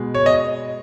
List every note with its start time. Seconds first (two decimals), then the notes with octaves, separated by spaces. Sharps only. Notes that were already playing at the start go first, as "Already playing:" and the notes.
Already playing: B2 G#3 B3
0.15 C#5
0.26 D#5